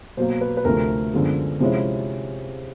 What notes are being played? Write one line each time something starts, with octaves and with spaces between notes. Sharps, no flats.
B2 F#3 A#3 C5
B4
B4
D2 C3 F3 A3 A#4
F#2 D3 F3 G#3 B3
C3 F3 G#3 C#4 E4